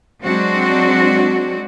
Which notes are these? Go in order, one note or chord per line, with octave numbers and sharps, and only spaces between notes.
F#3 G#3 C4 D4 F#4